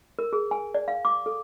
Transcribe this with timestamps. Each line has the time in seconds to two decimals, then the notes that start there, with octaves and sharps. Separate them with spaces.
0.19 A#4
0.33 G#4
0.51 G#5
0.74 D5
0.88 F5
1.05 D6
1.26 A4